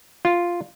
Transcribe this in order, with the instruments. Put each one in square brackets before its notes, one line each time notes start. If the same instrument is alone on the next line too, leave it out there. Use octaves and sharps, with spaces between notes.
[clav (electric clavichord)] F4